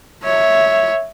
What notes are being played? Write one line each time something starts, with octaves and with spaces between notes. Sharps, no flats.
C#5 E5